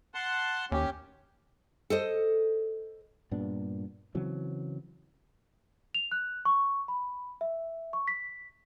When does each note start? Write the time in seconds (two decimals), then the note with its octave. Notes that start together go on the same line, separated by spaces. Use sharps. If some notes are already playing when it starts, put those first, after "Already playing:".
0.14 F#5 A5 C6
0.72 D#2 C#4 G4
1.90 A4 C5 D#5
3.31 G2 A#2 B3 D4
4.15 C#3 E3 F#3 C4
5.95 F7
6.12 F#6
6.45 C#6
6.88 B5
7.41 E5
7.93 C#6
8.08 B6